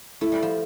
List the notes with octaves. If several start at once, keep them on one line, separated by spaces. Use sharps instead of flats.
A3 E4
G3
F3